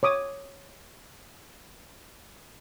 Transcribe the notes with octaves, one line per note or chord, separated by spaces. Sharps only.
C#5 D6 D#6